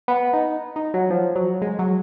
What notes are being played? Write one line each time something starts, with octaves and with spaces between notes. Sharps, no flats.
B3
D#4
D#4
F#3
F3
F#3
G#3
F#3